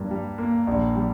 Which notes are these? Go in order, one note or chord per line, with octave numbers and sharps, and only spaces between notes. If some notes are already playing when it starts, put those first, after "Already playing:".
Already playing: G2 A#3
G3
A#3
A#1
G3